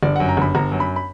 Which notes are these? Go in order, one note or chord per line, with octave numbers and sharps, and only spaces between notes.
G1 D5
F#2 F#5
A#5
G1 B5
G1 A#5
F#2
B5
B5